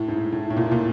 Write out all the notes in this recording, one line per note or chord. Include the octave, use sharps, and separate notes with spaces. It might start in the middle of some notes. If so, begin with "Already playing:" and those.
Already playing: A2
G#2
A2
A2
A#2
A#2